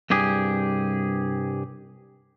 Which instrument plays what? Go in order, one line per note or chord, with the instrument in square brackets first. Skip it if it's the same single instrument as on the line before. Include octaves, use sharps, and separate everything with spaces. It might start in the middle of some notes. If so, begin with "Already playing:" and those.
[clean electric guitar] C2 G2 G4 G#4